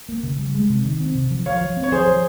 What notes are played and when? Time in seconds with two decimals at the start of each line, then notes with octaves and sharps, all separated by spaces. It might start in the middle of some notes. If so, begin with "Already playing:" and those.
0.09 A#3
0.23 C#3
0.39 G3
0.55 G#3
0.70 C3
0.85 D#3
1.00 C4
1.15 C3
1.30 F3
1.46 F3 C#5 F5
1.61 F3
1.77 C4
1.83 C#5
1.92 F3 G#4 C5
2.07 F3